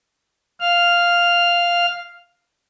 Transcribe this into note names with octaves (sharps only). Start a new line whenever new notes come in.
F5 F6